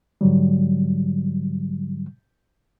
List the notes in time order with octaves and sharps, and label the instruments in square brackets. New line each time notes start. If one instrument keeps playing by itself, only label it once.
[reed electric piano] G#2 D3 F#3 G3